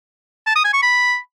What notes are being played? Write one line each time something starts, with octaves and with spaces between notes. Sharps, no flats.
A5
D#6
G#5
C#6
B5